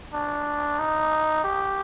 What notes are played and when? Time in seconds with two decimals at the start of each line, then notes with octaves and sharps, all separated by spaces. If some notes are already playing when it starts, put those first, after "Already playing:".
0.14 D4
0.79 D#4
1.44 G4